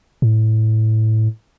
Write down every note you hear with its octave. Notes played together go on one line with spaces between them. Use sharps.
A2